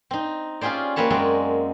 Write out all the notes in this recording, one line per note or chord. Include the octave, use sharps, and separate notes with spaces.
C4 D#4
C#4 F4 G4 G#4 C5 D5
A#3 C4 B4 C#5 A5
F#2 G#3 C4 F#4 D5